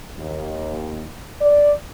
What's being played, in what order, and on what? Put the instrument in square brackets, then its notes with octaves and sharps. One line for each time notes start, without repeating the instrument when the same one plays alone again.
[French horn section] D#2
D5